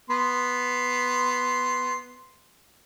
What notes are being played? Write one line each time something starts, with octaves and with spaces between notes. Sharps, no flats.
B3 C6